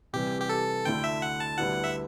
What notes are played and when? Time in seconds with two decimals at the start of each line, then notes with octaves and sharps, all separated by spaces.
0.13 C3 E3 G3 G4
0.41 G4
0.49 A4
0.85 D2 D3 A3 E4 G5
1.04 E5
1.22 F#5
1.40 A5
1.58 D2 D3 G3 B3 E4 F#5
1.84 E5